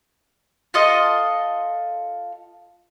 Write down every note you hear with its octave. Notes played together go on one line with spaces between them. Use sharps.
F4 A4 D#5